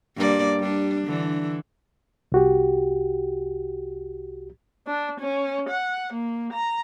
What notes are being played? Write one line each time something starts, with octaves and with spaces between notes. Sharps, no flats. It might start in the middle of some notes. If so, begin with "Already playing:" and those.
G2 A#3 D5
G3 D4
D3 E3
C2 F#4 G4
D4
C#4
F#5
A#3
A#5